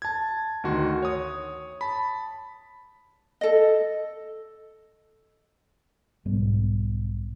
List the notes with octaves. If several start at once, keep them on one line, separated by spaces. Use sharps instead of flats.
A5 G#6
D2 D#3 F#4 C6
C#5 D#6
A5 B5
A4 D#5
B1 G#2 G3 B3